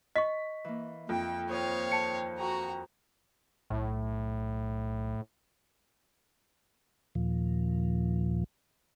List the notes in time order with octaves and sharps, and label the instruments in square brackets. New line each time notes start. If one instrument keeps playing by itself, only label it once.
[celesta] D#5 C#6 [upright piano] B6
[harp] E3 A#3
[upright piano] F2 [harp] A#3 D#4 F4 [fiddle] G5
[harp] D#2 C5 D#6 [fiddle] C#5 F5
[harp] C4 [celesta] A5 C#7
[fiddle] F#4 A#5 [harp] G#5 C#6
[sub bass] B1 [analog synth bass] A2
[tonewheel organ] D#2 A#2 F3